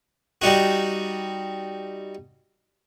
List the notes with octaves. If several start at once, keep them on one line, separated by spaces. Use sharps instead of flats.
G3 D#4 F#4